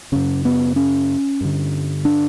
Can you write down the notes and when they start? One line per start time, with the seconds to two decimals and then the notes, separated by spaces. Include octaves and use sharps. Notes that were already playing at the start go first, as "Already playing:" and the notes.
0.12 F#2 C#3 C#4
0.45 B3
0.76 C#4
1.41 G2 D3
2.05 D4